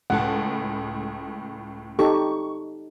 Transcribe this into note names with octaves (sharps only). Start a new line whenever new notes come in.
C#2 A2 F#5 A5
D#4 G4 A4 C#6